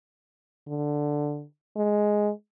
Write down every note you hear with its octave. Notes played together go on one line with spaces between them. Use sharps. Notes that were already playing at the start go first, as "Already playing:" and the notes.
D3
G#3